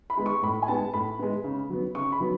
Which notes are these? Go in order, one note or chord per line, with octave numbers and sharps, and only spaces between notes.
B5
G#3 B3
C#6
A2 B5
G#5
G#3 B3 A5
A2 B5
G#3 B3
C#3
F#3 B3
C#3 C#6
B5
F#3 B3